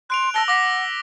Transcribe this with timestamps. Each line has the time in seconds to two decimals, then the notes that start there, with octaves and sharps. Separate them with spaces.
0.10 C6 F#6 D7 F7
0.34 A5 E6 A#6 G7
0.48 F#5 D6 A#6 B6